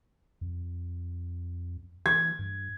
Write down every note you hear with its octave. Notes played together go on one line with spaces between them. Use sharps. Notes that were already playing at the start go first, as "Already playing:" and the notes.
F2
E3 G#6
G2